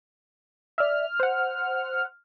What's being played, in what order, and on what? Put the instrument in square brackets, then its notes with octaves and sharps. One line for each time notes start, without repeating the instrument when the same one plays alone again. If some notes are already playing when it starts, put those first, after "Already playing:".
[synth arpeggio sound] D5 E5 [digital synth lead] F6
[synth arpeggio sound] C5 F#5